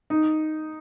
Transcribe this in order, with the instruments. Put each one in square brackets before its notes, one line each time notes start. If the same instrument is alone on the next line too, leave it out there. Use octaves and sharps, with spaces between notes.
[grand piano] D#4